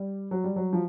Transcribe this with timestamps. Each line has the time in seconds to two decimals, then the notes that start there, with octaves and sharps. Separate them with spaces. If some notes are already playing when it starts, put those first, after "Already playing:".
Already playing: G3
0.31 F#3
0.44 G3
0.56 F#3
0.73 F3